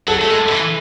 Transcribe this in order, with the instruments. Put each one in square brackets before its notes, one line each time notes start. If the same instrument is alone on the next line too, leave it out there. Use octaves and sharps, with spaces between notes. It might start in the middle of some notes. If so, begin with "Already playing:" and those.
[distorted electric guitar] F#3 [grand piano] A4
[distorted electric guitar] A3
G#3
E3